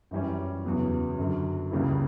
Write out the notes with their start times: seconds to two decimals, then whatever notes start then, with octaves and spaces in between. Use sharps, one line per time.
0.11 F#2 E3 G3 C#4
0.65 E2 C#3 F#3 B3
1.18 F#2 D3 F#3
1.71 C#2 C#3 G3 A#3 E4